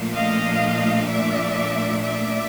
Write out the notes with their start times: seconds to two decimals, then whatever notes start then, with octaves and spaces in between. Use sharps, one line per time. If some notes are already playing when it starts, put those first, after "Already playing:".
Already playing: A#2 F3 A3 D4
0.14 D#5 F5
1.08 D5 E5
2.02 D5 E5